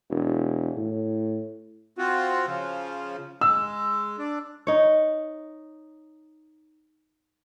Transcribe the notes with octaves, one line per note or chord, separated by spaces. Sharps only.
E1
A2
C4 F4 F#4
C#3 F3
G#3 E6
D4
D#4 C#5